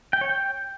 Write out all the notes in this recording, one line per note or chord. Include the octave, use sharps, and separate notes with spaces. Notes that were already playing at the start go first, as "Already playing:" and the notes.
G5
C#5
G5